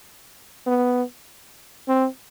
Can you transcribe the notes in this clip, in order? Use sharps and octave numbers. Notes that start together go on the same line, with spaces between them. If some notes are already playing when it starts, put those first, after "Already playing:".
B3
C4